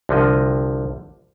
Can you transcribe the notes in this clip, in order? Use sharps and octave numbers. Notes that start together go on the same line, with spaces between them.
C2 D3 F3 D#5